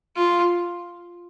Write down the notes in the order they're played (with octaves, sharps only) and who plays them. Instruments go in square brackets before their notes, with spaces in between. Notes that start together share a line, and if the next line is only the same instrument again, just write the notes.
[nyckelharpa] F4